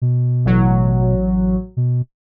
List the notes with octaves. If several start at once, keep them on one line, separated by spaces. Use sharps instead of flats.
B2
A1 F#3
B2